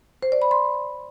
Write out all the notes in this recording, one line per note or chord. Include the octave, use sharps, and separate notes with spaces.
C5
D5
B5
C6